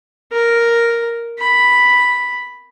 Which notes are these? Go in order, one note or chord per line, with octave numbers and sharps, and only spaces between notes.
A#4
B5